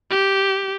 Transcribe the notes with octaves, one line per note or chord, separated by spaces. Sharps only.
G4